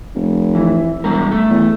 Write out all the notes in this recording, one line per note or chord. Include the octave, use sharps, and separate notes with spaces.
F1
E3
E1 F#3 G3 A#4
A3
E2